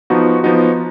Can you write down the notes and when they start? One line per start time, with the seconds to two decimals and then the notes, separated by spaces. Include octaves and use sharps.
0.10 F3 B3 D#4 F#4
0.43 F3 B3 D#4 F#4